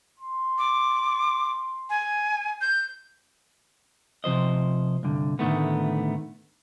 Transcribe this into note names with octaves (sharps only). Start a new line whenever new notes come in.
C6
D6
G#5
G6
C3 F3 C5 D#5
C2 G2 D3
A2 D3 D#3 A3 B3